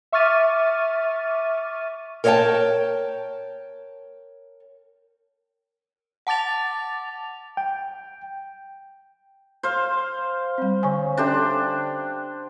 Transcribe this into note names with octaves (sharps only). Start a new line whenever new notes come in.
E5 C#6 D6 F6 A6 D#7
A#4 C#5 D#5 F#5 G5 A5
F#5 A5 D6 A6 F7
G5
C5 F5
G3 C4
D3 G#5
C#4 D4 G4 A4 C5 E5